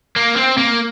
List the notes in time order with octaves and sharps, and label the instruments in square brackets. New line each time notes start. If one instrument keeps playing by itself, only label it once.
[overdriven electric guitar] A#3
C4
A#3